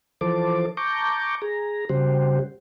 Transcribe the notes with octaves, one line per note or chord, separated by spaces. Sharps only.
E3 F3 A4 C5 A5 D6
A5 A#5 C#6 D6 G6
G#4 A#5
C#3 G3 F#4 G4 C5